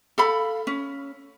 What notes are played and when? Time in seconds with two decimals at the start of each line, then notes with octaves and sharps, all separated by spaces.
0.18 A4 F5 B5
0.67 C#4